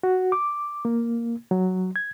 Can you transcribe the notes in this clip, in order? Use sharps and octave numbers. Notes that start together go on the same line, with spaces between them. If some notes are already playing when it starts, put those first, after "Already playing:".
F#4
D6
A#3
F#3
G#6